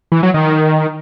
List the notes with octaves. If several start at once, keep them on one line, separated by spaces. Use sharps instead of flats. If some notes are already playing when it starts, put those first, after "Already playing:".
E3
F#3
D#3